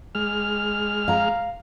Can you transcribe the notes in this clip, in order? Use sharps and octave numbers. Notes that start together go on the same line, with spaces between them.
G#3 F6
F5 A#5